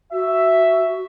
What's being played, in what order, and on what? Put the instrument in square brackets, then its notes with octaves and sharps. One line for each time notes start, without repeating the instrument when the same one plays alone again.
[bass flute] F#4 [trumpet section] E5